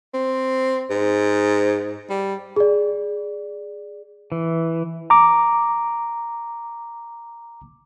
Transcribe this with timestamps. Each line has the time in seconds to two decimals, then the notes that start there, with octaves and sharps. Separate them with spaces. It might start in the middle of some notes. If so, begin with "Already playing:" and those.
0.14 C4
0.90 G#2
2.10 G3
2.56 G#4 D5
4.32 E3
5.10 A#5 D6